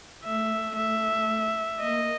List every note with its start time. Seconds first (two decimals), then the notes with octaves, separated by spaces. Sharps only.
0.24 A3 E5
0.76 E5
1.80 A#3 D#5